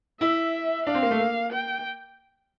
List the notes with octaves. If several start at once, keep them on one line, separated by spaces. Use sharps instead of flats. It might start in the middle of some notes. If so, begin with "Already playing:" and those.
E4 E5
D4 F5
C4
A#3
A3
A#3
G5